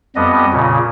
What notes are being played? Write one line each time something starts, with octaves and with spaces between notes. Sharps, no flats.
F2 G3 B3 D#5
A#2 C#3